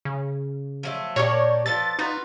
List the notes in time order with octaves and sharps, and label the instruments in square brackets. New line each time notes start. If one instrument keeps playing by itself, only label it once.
[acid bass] C#3
[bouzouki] F3 F#3 A3
[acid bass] A#2 [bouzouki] D4 G4 A#4 [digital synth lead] C#5
[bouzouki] F3 B3 A4 [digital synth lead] A6
[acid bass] D#4 [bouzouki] F4 F#4 B4